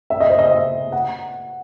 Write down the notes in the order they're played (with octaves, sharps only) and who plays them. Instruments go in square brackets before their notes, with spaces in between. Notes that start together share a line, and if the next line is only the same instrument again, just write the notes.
[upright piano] E5
D#5
C5
D#5
E5
F#5